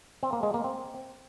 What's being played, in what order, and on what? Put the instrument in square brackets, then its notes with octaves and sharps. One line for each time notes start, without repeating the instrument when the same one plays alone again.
[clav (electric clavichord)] C4
A#3
G#3
A#3
C4